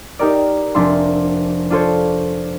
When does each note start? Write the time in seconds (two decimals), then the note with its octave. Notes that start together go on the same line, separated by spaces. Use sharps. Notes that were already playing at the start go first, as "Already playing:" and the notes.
0.19 D#4 G4 A#4 D5
0.75 F1 C4 D4 E5 C6
1.70 D4 F4 A4 C5 C#5